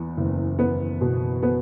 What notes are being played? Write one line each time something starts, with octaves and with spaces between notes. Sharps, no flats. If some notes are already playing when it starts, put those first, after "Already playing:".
Already playing: E2 B3
F#1
B3
B2
B3